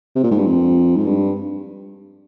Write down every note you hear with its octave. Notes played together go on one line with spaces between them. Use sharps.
C3
A#2
G#2
G2
F2
G#2
G2